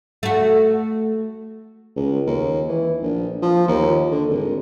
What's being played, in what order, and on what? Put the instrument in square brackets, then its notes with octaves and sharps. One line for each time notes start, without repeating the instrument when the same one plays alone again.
[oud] A3 F#4
[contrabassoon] C#2
D#2
E3
A#1
F3
D#2
D3
G#1